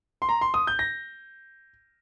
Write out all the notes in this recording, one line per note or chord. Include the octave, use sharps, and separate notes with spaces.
C6
A#5
C6
D#6
G6
A#6